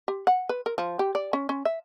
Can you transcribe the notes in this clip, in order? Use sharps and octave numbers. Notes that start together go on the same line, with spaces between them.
G4
F#5
B4
A#4
F3
G4
D5
C#4
C#4
E5